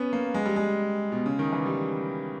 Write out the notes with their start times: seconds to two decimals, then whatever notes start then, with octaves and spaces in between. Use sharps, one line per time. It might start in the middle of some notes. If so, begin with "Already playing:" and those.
Already playing: B3 C#4
0.13 A#3
0.34 G#3
0.45 G3
0.56 G#3
1.12 B2
1.26 C#3
1.39 D#3
1.52 E3
1.66 G3